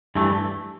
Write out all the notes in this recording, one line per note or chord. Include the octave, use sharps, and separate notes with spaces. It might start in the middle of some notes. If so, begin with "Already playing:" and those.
G2 E3 A3